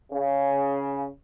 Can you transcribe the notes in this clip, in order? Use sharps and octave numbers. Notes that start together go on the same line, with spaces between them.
C#3